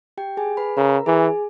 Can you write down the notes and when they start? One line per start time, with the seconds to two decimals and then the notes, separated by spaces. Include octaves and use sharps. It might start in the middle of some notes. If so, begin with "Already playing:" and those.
0.18 G4 G5
0.37 G#4 G#5
0.57 B4 B5
0.77 C#3 A#4 A#5
1.06 E3 G#4 G#5